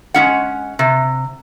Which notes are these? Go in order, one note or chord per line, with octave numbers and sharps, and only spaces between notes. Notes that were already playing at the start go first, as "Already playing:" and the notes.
G#3 C#4 F#5
C3